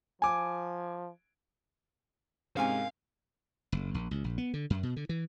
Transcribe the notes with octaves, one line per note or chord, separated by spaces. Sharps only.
F3 G#5 D6
G#2 C3 G#3 C4 C#4 A#4 F5 G#5
F#1
A#1
C#2
A#1
B3
D3
F#2
B2
D3
E3